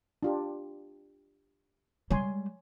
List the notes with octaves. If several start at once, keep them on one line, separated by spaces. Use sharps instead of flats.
D4 F4 G4
G3 G#3 C#5 G#5 C6